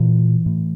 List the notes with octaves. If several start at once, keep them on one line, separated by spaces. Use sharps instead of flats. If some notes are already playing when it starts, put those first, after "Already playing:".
Already playing: A#2 E3
A2